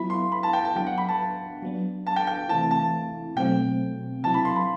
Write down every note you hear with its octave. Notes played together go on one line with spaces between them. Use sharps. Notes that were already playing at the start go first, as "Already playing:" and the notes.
Already playing: F#3 B3 E4 B5
C6
B5
A5
G5
A5
F#3 B3 D4 G5
F#5
B5
A5
F#3 B3 D4
A5
G5
G5
C3 E3 A3 C4 E4 A5
A5
B2 F#3 A3 C4 G5
C3 F#3 C4 E4 A5
B5
C6
B5